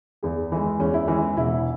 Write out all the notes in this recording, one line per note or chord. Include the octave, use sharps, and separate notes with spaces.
E2 G#4
E3 G#3
E2 C#4
E4
E3 G#3 C#4
E1 E4